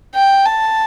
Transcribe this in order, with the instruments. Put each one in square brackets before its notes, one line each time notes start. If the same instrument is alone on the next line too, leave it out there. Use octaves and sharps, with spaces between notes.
[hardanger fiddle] G5
A5